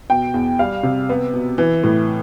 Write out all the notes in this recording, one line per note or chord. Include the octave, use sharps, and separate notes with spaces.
B2 G5
E2
G3 F5
C3
B3
B2
E3
A2